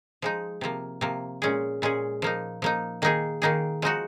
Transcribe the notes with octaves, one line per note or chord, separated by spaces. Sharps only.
F3 G#3 D#4
C3 F3 A#3
C3 F3 A#3
A#2 G#3 C#4 G#4
A#2 G#3 C#4 G#4
F3 A#3 D#4
F3 A#3 D#4
D#3 A#3 D#4 G#4
D#3 A#3 D#4 G#4
F3 G#3 D#4 F#4